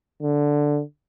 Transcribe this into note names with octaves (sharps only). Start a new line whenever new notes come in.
D3